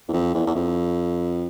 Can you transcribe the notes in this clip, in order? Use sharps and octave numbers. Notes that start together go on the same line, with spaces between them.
E2
F2
E2
E2
F2